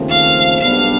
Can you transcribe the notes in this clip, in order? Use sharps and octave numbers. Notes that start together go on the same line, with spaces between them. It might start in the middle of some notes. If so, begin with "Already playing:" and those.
Already playing: D#2 C#3 F3 A3 C4
F5
B1 B2 G3 B3 D4 F5